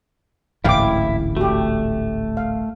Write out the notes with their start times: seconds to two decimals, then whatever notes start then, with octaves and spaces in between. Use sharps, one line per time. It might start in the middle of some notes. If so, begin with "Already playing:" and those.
0.64 D1 A1 G#2 E4 F5 G5 D6
1.37 A3 F#4 G4
2.37 F5